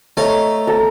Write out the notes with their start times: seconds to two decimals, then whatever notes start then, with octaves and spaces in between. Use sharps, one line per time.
0.17 A3 C#5 D#5 A#5
0.67 A4 A#5